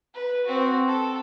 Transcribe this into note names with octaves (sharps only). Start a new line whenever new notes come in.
B4
C4 F#4
A4